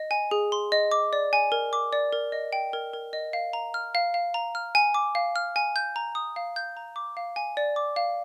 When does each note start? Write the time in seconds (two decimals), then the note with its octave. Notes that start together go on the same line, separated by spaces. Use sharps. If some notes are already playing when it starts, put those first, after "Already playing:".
Already playing: D#5
0.11 G#5
0.31 G#4
0.52 C6
0.72 D#5
0.92 D6
1.13 D5
1.33 G#5
1.52 A#4
1.73 D6
1.93 D5
2.13 A#4
2.32 D#5
2.53 G5
2.73 A#4
2.93 A#4
3.13 D#5
3.33 F5
3.53 A#5
3.74 F6
3.95 F5
4.14 F5
4.34 A#5
4.55 F6
4.75 G#5
4.94 D6
5.15 F5
5.36 F6
5.56 G#5
5.76 G6
5.96 A#5
6.15 D#6
6.36 F5
6.56 G6
6.77 A#5
6.96 D6
7.17 F5
7.36 G#5
7.57 D5
7.76 D6
7.96 F5